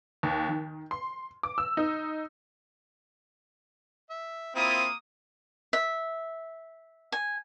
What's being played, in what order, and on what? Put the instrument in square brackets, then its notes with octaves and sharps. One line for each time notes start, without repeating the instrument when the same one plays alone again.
[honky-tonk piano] D#2
D#3
C6
D6
E6
D#4
[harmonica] E5
[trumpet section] A#3 D#6 [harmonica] C4 E4 F4
[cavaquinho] E5
G#5